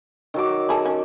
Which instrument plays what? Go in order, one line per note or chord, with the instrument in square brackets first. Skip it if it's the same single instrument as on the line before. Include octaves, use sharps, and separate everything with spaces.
[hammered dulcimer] D#3 F#3 D6
[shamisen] E4 G#4 A4
C#4